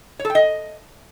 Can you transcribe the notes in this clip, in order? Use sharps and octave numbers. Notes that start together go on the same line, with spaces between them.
C#5
A4
G5
D#5